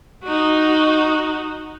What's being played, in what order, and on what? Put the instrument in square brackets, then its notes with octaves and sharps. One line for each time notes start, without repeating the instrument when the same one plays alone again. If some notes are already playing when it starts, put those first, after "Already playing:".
[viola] D#4 F#4